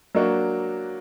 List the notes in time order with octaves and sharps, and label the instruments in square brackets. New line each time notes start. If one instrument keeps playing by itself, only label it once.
[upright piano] F#3 A#3 D4 F#4